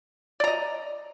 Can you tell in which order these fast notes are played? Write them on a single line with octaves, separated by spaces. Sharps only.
D5 A#5 D#5